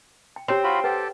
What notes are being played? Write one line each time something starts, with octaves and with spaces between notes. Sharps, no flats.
G5
C4 G4 C#5 C6
F4 F#4 B5
G4 A4 B4 F#5